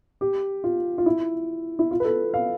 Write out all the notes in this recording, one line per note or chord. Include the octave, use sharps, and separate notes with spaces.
G4
F4
F4
E4
E4
F4
B4
A4
F5